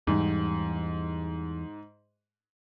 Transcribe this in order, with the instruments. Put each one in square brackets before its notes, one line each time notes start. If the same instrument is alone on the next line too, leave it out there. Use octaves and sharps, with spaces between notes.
[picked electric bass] E2 E3 G3 [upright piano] G#2